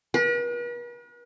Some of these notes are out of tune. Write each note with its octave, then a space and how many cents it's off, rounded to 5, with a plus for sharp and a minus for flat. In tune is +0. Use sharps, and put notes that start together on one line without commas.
B4 -45